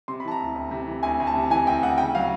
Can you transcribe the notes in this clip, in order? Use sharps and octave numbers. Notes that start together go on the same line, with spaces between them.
C3 C6
B5
E3 A5
A#5
D2
D2
C3
E3
D2 G#5
D2
A5
C3
E3 G#5
D2 G5
D2 F#5
C#3 G5
F#3 F5